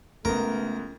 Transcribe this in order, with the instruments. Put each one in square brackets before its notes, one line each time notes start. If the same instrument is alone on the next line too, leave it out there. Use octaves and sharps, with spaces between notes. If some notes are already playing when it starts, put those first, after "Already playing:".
[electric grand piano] C#2 B3 [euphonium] A3 [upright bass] C#4 E4 [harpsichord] A#4